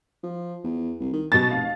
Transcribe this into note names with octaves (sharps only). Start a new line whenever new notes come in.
F3
E2
C2
D#3
F#2 B2 A6
F1 F5